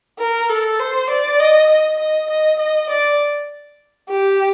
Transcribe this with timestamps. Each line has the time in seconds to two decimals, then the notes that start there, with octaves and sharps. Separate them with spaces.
0.19 A#4
0.49 A4
0.79 C5
1.10 D5
1.39 D#5
1.69 D#5
1.99 D#5
2.29 D#5
2.59 D#5
2.89 D5
4.09 G4